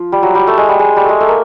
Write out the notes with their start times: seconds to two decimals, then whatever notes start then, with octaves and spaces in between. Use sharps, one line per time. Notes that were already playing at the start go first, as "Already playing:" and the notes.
Already playing: F3
0.12 G3
0.23 F#3
0.35 G3
0.47 A3
0.57 G#3
0.68 G3
0.79 G#3
0.96 G3
1.04 G#3 A3
1.21 A3
1.28 A#3